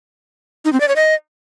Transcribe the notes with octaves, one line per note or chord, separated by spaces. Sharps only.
D#4
C4
D5
C#5
D#5